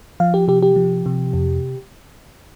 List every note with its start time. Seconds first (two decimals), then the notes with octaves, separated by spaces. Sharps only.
0.20 F3 F5
0.34 G4
0.48 C3 G4
0.63 G4
0.76 F3
1.06 C3
1.33 F2